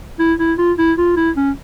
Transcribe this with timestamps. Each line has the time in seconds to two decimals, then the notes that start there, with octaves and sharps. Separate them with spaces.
0.19 E4
0.39 E4
0.58 F4
0.78 E4
0.98 F4
1.17 E4
1.37 C#4